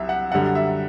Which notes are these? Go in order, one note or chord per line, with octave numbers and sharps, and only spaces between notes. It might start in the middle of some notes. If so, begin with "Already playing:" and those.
Already playing: C2 F#3 E5
F#5
F#2 D3 G3 F#5
E5